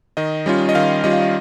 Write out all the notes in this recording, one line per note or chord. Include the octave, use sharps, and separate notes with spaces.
D#3 D#5
G3 C#4 F4
D#5
D#3 F5
G3 C#4 F4 D#5
F5
D#5